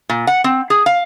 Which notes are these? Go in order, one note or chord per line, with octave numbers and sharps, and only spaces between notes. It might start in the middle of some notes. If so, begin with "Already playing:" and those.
A#2
F#5
C4
G#4
F5